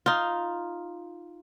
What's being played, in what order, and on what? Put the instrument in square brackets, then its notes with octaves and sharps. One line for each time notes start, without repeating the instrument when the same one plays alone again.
[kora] D#4 F4